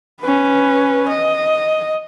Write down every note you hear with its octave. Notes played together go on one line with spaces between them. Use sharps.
C#4 B4
D#5